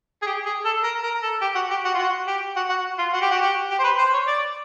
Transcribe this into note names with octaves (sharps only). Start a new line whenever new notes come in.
G#4
G4
G#4
A4
A#4
A#4
A4
G4
F#4
G4
F#4
F4
F#4
G4
F#4
F#4
F4
F#4
G4
F#4
G4
G4
C5
B4
C5
C#5
D5